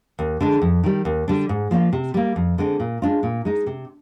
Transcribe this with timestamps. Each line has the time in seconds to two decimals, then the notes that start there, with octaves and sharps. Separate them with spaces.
0.19 D#2
0.41 D3 G#3 D4
0.62 F2
0.84 D#3 G3
1.05 D#2
1.28 D3 G3 D4
1.49 G#2
1.71 F3 A#3 F4
1.93 C3
2.14 G3 A#3
2.36 F2
2.58 D3 G#3 C4
2.80 A#2
3.02 G#3 D4 F4
3.23 A#2
3.45 G#3 D#4
3.67 C3